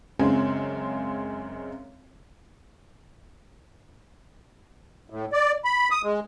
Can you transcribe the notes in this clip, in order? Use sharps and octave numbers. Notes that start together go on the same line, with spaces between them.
F#2 C#3 G#3 C4 C#4
A2
D5
B5
D#6
G#3